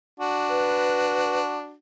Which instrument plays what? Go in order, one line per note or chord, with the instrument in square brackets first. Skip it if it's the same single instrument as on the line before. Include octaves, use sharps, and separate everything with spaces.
[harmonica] D4 F#4
[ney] B4